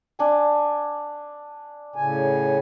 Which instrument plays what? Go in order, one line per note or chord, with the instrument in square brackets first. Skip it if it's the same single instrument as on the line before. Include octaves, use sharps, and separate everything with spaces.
[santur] D4 G#5
[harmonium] A2 C#3 G#5